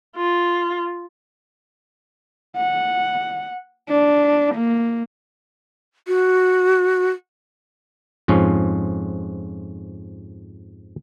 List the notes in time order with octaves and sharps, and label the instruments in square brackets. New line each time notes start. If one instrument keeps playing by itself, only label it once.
[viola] F4
[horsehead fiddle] F#5
D4
A#3
[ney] F#4
[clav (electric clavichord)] F2 G#2 F3 C#4